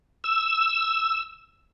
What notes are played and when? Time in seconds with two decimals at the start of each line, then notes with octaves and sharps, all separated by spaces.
0.24 E6